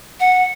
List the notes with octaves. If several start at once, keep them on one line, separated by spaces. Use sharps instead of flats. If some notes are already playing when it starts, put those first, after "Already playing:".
F#5